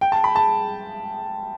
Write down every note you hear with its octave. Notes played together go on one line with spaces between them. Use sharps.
G5
A5
B5
A5